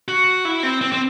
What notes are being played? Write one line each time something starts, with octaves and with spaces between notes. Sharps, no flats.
F#4
E4
C4
C4
C4